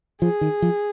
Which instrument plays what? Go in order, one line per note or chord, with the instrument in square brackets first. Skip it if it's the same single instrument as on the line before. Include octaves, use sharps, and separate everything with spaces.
[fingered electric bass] F3 [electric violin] G#4
[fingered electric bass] D#3
F3